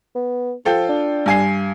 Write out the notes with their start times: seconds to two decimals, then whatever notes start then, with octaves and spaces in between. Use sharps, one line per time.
0.15 B3
0.65 F3 F4 A4 G5
0.89 D4
1.26 G2 G#5 C7